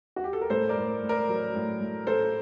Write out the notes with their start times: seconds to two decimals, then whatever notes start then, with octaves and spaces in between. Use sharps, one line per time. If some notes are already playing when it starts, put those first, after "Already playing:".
0.16 F#4
0.24 G4
0.33 A4
0.41 A#4
0.50 A2 A4 C5
0.69 A#4 D5
0.77 A2
1.03 A2
1.09 A#4 D5
1.29 F#3
1.55 A2
1.81 A2
2.07 A3 A4 C5